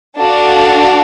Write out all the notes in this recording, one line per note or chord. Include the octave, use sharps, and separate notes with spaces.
D4 F#4 A4 D5 F5